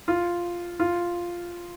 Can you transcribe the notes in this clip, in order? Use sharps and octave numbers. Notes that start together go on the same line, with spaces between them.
F4
F4